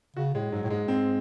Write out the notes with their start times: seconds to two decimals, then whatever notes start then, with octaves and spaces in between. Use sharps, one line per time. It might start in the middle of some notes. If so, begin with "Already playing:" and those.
0.16 C#3 F#4
0.35 A2 G#3
0.52 G#2 F#3
0.64 A2
0.70 G#2 G#3
0.88 G#2 C4